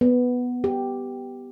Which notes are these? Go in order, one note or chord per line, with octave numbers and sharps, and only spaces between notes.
B3
G4